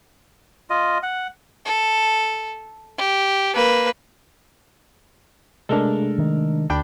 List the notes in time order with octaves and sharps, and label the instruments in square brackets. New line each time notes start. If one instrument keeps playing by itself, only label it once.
[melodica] F4 D#5
F#5
[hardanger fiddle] A4
G4
A#3 B4
[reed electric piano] C3 D4 [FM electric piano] G#3 A3 [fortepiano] A4 A#4
[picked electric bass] D#3
[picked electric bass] D2 [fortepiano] D4 G5 B5